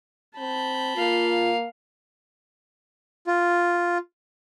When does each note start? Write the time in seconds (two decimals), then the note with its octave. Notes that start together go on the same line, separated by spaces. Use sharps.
0.39 C4 A5 B5 G6
0.97 A#3 F4 F5
3.27 F4